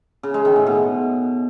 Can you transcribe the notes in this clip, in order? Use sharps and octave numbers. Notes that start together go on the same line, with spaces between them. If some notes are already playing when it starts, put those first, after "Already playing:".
C#3
G#3
D#3
A2
B2